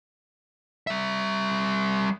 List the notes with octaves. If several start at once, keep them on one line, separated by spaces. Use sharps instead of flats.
G3 E5